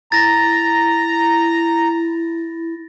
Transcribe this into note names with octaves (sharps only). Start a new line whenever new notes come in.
E4 A#5 A6 A#6